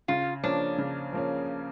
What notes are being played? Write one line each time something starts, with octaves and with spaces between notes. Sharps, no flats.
C#3 F4
F3 A#3 C#4 D4
C#3
F3 A#3 C#4